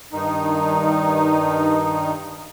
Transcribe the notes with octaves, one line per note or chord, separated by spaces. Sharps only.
G2 D#3 D#4